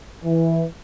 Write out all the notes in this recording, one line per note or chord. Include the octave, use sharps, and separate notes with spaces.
E3